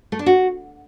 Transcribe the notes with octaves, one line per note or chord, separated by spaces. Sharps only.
A3
D4
F#4